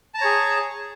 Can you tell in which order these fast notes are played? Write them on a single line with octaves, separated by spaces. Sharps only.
A5 A#5 C#5 G#4